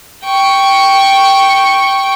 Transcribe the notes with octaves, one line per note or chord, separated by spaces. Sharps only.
G5 C#6